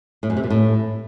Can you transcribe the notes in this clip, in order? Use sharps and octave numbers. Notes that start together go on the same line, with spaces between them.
A2
F#2
C3
A#2
A2